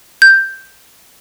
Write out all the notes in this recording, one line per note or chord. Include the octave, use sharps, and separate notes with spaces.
G6